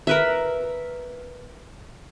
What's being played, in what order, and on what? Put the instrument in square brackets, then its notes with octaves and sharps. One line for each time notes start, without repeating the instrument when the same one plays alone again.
[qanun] A#4 B4 E5